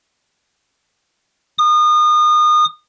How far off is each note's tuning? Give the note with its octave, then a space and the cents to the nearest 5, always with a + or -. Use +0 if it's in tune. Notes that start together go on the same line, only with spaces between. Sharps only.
D#6 -30